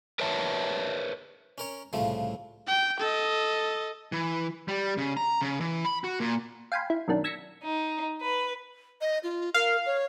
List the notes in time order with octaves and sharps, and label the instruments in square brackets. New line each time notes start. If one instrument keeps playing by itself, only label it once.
[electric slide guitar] A#4 B4 C#5 E5 A5
[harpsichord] C#4 A#4 C#5
[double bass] C2 A2 [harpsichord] C#3 F3 A3
[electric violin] G5
A4 D#5
[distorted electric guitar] E3
G3
C#3
A#5
C#3
E3
B5
F#4
A#2
[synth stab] F5 G5 G#5 B5 C6
E4
F#2 B2 D#3 D4
E6 G#6 A#6 B6 C#7
[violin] D#4
B4
[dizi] D#5
F4
[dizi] A#4 [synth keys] F5
[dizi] C#5